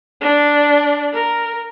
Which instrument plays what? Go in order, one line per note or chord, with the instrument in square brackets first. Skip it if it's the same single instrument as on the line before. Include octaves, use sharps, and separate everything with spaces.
[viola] D4
A#4